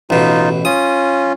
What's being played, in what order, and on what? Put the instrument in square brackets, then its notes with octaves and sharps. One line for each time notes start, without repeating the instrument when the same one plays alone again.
[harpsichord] A1 B2 [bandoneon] D#4 F4
[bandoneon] C#4 F4 [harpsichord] D#6